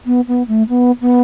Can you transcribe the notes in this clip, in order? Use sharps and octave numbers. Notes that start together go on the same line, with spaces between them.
B3
B3
A3
B3
B3